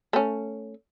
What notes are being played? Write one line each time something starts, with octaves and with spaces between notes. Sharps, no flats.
A3 C#4